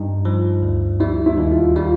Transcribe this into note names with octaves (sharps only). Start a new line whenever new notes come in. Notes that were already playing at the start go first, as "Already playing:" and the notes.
Already playing: G2 G3 D#4
F3
D2
G3 E4
E4
D#2
F4
G3 F4